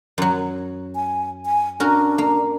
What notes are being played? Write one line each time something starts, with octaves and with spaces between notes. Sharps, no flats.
F#2 F#3
G#5
G#5
C#4 D4 F#4 A#4
A#3